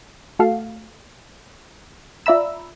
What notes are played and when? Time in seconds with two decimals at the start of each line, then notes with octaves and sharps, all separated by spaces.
0.39 A3 F#4 A4 F5
2.26 F4 D5 E5 A#5 B5 E6